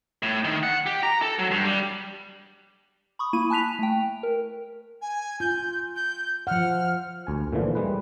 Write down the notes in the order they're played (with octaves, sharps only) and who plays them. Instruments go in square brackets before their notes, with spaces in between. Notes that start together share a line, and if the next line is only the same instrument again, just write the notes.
[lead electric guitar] A2
D#3
F#5
G4
A#5
A4
F#3
G2
G3
[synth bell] B5 C#6 D#6
A#3 E4 B5 D#7
G#5 A5 F#6 B6 F7
A3 G5
A#4
[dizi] G#5
[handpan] F4 [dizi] G6
[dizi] G6
[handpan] F3 F#5 [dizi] F6
[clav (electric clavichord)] D2 G#5
A#2 D3 E3 F3
G3 G#3 B4